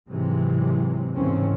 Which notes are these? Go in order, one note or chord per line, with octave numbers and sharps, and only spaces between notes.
G#2 C3 E3 F#3 G#3
E2 G#2 C#3 A#3 C4 C#4